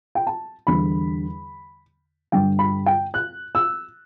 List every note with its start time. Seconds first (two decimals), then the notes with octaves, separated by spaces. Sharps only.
0.15 G5
0.27 A5
0.67 E2 D3 G3 B5
2.32 G2 D3 G3 G5
2.59 B5
2.86 G5
3.14 F#6
3.55 E6